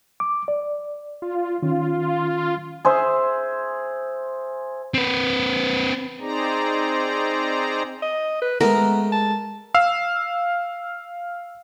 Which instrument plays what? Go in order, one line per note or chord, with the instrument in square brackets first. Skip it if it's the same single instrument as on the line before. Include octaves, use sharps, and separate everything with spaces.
[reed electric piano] D6
D5
[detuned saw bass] F4
[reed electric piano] D#3 C#4 [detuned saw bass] F4
[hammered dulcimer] G#4 C5 E5
[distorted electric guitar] C4 B4
[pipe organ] C4 D#4 G#4 C5 D5 A#5
[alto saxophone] D#5
B4
[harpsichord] G#3 A3 [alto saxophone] B3 [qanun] A#4
[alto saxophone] A5
[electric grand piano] F5 E6